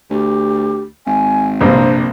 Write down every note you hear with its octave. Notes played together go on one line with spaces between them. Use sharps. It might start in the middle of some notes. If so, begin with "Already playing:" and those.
D2 G4
G#1 G#5
A#1 G2 C3 G3 A#3 C5